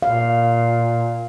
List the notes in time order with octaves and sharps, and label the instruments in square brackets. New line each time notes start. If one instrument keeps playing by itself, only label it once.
[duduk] A#2 [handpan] F5